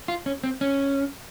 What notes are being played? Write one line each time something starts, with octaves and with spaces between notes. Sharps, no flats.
F4
C#4
C4
C#4